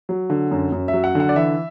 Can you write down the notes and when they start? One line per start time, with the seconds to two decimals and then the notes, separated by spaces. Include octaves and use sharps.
0.09 F#3
0.30 D3
0.51 F#2
0.72 F#2
0.88 E5
0.93 F#3
1.04 F#5
1.15 D3 F#5
1.29 D5
1.36 E3 E5